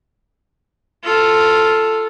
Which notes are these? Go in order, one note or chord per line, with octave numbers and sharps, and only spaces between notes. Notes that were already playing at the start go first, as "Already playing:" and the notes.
F4 A4